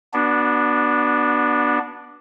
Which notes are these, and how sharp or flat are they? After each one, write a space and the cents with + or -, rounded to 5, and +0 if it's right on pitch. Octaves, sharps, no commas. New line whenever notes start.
B3 -25 D4 +0 F#4 +0